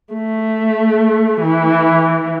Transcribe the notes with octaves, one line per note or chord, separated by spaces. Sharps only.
A3
E3